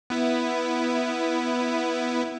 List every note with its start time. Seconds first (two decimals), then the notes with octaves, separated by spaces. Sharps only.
0.10 B3 E4